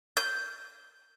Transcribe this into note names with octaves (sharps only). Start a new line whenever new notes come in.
G6